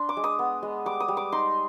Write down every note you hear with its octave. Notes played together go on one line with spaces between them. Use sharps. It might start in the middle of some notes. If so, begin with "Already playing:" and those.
Already playing: D4 C6
D6
G#3
D#6
B3
G#3
G3 D6
D#6
G3
D6
D#4 C6